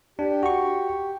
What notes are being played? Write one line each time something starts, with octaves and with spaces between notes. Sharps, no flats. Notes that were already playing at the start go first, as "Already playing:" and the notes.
D4 G4
F#4 C#6